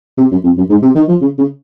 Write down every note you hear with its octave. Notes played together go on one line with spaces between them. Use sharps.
C3
F#2
F2
F#2
G#2
C3
D#3
F3
C#3
C#3